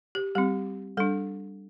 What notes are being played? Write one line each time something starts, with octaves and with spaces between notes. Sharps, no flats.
G4
G3 C4 G4
G3 D4 A4